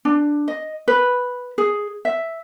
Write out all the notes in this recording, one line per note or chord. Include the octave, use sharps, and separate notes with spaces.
D4
D#5
B4
G#4
E5